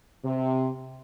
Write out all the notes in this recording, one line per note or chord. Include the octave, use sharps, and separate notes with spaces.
C3